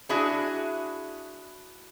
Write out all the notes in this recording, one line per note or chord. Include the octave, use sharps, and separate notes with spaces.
D4 E4 F#4 G#4 E5